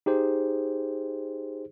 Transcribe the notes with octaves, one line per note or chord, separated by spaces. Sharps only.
D#4 G4 G#4 C5